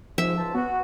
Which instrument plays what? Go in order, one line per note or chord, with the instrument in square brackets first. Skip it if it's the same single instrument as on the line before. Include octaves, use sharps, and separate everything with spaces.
[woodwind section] G#2 [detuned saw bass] F3 [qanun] E5
[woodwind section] C#2 C5 A5
[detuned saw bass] B3 [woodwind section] F#4